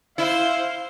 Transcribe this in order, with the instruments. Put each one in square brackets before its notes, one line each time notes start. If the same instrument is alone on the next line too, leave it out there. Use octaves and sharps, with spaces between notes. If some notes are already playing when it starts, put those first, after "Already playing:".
[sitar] E4 [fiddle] C5 [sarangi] F5